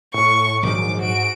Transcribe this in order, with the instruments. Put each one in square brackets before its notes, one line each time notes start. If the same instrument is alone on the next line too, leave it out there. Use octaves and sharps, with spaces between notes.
[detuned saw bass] A2 [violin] C#6
[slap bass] A#1 D#3 F#3 [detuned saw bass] G#2 [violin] D6
[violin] F#4 D7